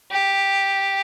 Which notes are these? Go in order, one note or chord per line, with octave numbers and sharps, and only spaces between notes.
G4